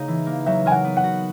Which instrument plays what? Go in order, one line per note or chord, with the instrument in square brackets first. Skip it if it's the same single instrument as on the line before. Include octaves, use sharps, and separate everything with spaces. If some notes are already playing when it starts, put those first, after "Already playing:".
Already playing: [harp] C#3 A#3 D#4
E3
A#3
[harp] F#3 [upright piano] E5
[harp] A#4 [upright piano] G#5
[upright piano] F#5
[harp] B3
[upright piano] F#5
[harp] F#4